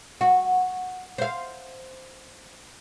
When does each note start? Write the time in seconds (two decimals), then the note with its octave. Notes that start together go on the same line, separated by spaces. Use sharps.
0.21 F#4
1.18 C5 F5